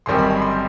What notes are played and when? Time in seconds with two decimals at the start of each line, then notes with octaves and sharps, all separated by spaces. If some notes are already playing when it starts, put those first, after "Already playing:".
0.06 G1 F#2 D#3 G3 C4 C6
0.18 B5
0.30 B5
0.42 C6